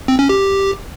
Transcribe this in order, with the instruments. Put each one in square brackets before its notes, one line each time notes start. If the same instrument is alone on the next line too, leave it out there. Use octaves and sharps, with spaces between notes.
[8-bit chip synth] C4
C#4
G4